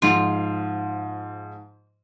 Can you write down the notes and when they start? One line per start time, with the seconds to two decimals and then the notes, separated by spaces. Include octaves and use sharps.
0.02 G#2 F3 F4